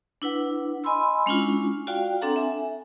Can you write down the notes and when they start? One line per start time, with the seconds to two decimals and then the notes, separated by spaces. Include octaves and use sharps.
0.22 D4 E4 B4 F#5
0.84 D#5 G#5 B5 C6 E6
1.26 G#3 C#4 D4 E4 F4
1.87 F4 F#4 D5 F5 G5
2.21 C4 D4 A4 F#5 A#5
2.36 E5 G#5